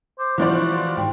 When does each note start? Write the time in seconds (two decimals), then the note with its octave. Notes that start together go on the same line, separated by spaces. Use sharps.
0.19 C5 D6
0.38 E2 E3 F3 F#4 D5 C6
0.97 G#2 D#3 G5